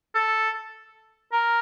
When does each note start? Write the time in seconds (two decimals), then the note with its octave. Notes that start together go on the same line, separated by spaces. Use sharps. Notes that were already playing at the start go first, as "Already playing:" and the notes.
0.15 A4
1.33 A#4